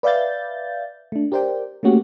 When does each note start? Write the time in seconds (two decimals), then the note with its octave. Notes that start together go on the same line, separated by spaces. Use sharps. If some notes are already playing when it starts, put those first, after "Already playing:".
0.03 B4 D5 E5 F5 G6 A6
1.12 A3 D4
1.32 G4 A#4 C5 D5 G5
1.83 A3 A#3 C#4 F#4 G4